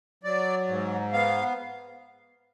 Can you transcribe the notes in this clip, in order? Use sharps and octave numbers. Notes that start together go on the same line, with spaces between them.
F#3 D5
G#2
B3 F5